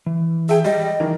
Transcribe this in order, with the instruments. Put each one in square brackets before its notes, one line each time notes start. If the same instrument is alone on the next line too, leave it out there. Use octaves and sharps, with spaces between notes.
[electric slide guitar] E3
[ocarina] G#4 [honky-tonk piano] E5 G5
[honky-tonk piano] G3 [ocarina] D#5 [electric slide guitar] G5
[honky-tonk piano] D#3 E3 A#4